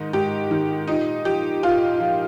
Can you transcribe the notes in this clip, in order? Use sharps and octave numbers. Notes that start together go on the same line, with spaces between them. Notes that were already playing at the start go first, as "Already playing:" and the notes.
Already playing: G#2 D#3 D#4
G#2 G4
D#3
A#2 D#4
F3 G4
A#2 F4
F3